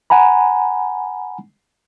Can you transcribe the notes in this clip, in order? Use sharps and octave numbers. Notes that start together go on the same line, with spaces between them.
F#5 G#5 A#5 B5